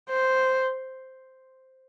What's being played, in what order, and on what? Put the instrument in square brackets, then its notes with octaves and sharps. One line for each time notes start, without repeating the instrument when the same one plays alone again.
[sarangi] C5